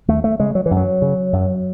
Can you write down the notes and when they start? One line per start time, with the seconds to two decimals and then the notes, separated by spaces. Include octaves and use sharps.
0.08 D#2 A3
0.24 A3
0.40 C#3 G#3
0.55 F#3
0.66 E3
0.71 F#2
0.77 F#3
1.02 C#3
1.33 F#2